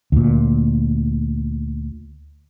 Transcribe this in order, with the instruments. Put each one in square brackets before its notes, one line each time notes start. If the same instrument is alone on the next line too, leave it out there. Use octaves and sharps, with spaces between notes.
[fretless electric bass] D2 A#2